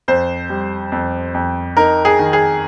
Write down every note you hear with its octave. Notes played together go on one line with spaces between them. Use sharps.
F2 C5
G3
F2
F2
D#4 A#4
G#4
D#3
G#4